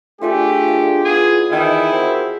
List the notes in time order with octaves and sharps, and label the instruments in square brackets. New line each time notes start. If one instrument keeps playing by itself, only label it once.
[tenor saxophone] A3 [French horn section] D4 G#4 [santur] F4 D5 G#5 [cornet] G4
[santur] D5 F5
[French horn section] B3 E4 F4 [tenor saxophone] G#4
[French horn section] E2 [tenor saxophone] D#3 [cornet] E4 [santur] G#4 D#6
[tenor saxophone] C4 [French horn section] F#4 A#4